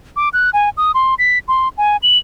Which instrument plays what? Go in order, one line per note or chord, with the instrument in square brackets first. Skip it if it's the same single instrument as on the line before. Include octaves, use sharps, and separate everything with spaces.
[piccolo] D6
F#6
G#5
D#6
C6
B6
C6
G#5
F#7